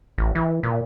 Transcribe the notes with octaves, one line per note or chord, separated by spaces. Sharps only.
A1
E3
A#2